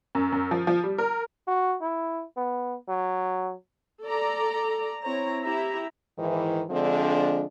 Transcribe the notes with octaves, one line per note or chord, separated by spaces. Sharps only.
F#2
F#2
F3
F3
G3
A#4
F#4
E4
B3
F#3
A4 D5 A#5
C4 E4 C#5 A#5
E4 G4 E5 A#5
G#2 D#3 E3
D3 F3 G#3 C4 D4